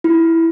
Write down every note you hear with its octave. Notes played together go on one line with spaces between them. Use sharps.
E4